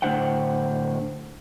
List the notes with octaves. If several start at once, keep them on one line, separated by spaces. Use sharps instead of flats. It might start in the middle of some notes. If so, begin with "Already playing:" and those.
A2 D3 E4 C5 F#5 G5